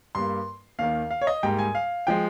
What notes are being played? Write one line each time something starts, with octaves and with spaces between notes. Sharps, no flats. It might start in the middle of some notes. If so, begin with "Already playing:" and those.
G2 G3 A#3 C6
D#2 D#3 A#3 F5
F5
C#5
D#5
G#2 G3 A#3 G5
G#5
F5
F3 G#3 G5